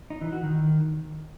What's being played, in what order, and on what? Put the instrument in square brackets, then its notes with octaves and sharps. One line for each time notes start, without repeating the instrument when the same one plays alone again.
[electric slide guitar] D#4
E3
F#4
D#3